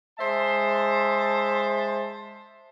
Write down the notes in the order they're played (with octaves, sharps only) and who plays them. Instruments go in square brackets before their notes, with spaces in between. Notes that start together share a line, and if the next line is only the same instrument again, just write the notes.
[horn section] G#3 C5 E5 A5